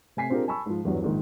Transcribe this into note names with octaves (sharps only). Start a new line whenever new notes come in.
C3 A3 G#5 B6 C7
C4 D4 F4 G4 G#4 A#4
G#5 A5 B5 C#6 E6
G#2 F3
E2 G2 F#3
A#1 G#2 D#3